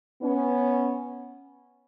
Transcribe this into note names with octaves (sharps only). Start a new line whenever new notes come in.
B3 C#4